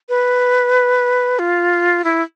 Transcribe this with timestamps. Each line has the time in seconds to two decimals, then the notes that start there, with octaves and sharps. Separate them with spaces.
0.09 B4
1.39 F4
2.04 E4